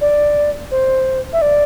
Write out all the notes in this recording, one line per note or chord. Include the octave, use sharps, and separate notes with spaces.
D5
C5
E5
D5